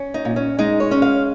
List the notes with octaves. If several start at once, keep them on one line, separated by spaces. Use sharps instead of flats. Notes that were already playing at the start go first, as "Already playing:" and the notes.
Already playing: C#4
D#4
A#2
C#4
G#3 D#4
C#5
C#4
F5